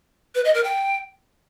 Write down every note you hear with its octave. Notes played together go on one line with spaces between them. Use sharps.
B4
D#5
A#4
G5